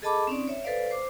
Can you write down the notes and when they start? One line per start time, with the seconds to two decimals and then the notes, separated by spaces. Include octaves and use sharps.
0.02 G#4 A4 D#5 A5 B5 D6
0.27 C4 C#4 D#4 D5
0.48 C#5 E5
0.64 A4 B4 C5 D5 F5
0.91 C5 D6